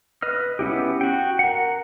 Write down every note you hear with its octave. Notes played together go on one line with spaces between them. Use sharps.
B4 D#5 F6
B3 C#4 E4 G4
F#4 G5
A#4 F#5